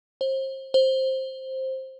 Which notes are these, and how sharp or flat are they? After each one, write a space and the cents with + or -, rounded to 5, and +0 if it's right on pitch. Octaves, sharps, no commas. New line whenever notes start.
C5 +30
C5 +10